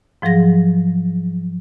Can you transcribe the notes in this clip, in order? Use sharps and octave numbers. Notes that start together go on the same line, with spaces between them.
G#2 F3 F#3 G#4 A#6